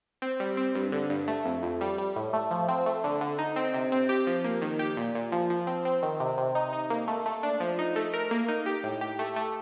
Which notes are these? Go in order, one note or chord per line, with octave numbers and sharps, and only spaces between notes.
C4
G3
C4
G2
D3
G2
A3
F2
F2
G3
G3
A2
A3
F3
C4
A3
D3
D3
D#4
C4
C3
C4
G4
F3
A#3
D#3
G4
A#2
A#2
F3
F3
C4
C4
D#3
C3
C3
D#4
D#4
A#3
A3
A3
D4
F3
D#4
A3
A#4
A#3
D#4
G4
A2
G4
A3
A3